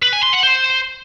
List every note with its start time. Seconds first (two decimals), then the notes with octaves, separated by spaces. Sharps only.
0.03 B4
0.13 G#5
0.23 C6
0.33 F#5
0.43 C5